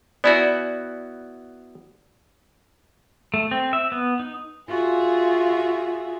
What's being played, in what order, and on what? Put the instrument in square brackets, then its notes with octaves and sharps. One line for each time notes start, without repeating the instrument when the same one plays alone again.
[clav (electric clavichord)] B3 E4 F#4 [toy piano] D5 G#5 B5
[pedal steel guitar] A3
C4
E5
B3
D#4
[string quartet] F4 F#4 G#4 E5